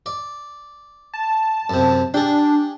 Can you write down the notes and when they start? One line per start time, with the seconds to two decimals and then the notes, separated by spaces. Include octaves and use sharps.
0.06 D5
1.14 A5
1.70 F#2 C3
2.14 D4 G4 G#4